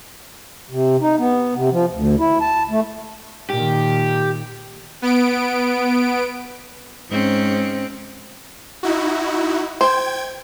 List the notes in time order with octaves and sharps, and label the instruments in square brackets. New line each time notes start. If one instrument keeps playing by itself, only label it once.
[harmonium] C3
D#4
B3
C3
F3
D2
E4
A5
A3
[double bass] A#2 D#3 [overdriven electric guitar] G4
[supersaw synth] B3 D7
[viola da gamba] G#2 C4 C#4
[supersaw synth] D#4 E4 F#4
[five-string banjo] C5 [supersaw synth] G5 G#6